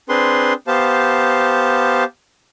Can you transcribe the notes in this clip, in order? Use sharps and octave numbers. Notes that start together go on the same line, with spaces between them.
C4 D4 G#4 B4 C6
B3 G4 C5 F5 A5